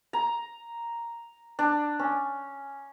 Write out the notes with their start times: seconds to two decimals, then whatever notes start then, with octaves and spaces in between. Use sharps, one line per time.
0.13 A#5
1.59 D4
2.00 C#4